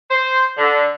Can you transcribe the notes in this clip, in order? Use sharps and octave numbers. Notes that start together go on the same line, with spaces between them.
C5
D3